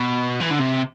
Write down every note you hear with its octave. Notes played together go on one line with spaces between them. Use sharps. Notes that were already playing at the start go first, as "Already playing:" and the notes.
Already playing: B2
E3
D3
C3